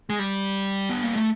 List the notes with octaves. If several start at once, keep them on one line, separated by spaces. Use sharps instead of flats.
G#3
G3
B3
A#3
A3